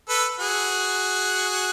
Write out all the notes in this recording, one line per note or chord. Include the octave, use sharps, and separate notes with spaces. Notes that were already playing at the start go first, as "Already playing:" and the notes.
A4 B4
F#4 G#4